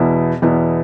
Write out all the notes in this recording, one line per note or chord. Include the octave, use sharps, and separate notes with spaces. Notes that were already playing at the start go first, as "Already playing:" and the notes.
Already playing: E2 B2 B3 E4
E2 B2 B3 E4